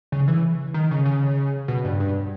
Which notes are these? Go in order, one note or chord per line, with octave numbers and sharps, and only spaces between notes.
C#3
E3
D#3
C#3
C#3
B2
G2
G2